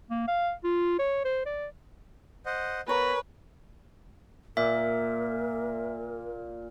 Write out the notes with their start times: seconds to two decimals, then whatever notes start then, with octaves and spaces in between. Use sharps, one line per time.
0.10 A#3
0.28 F5
0.64 F4
0.99 C#5
1.25 C5
1.46 D5
2.46 C5 D#5 F#5
2.88 B3 A#4 B4 C#5 G#5 A#5
4.57 A#2 A#4 E5